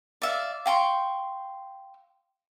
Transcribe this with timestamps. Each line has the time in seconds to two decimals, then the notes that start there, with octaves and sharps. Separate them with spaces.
0.22 D5 E5 F5
0.66 F5 G5 C6 C#6